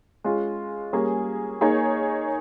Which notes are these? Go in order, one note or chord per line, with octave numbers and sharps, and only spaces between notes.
G#3 C#4 F4
G3 A#3 C#4 G#4
A#3 D#4 G#4 C#5